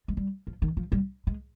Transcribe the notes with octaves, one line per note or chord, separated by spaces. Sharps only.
G#3
G3
F3
D#3
F3
G3
G#3